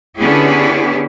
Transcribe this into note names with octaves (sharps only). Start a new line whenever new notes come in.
D3 B3 C#4 E4 G4 G#4